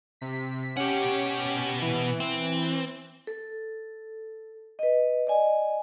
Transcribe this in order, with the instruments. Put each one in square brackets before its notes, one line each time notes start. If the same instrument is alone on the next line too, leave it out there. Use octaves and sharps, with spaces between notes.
[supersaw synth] C3 B6
[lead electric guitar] B2 F#5 [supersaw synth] C#4 G4
[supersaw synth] E3
[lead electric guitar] C4
[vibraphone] A4
B4 D#5
D5 D#5 G#5